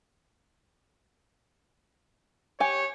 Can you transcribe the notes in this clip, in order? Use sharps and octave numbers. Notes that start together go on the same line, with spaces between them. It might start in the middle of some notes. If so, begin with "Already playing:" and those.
G4 C#5 G#5